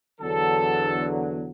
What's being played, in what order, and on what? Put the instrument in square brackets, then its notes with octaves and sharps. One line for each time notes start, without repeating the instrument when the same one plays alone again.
[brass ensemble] E2 D3 F#3 A4